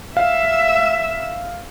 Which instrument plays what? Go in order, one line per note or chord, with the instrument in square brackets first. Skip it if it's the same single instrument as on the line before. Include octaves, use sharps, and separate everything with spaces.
[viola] E5 [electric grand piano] F5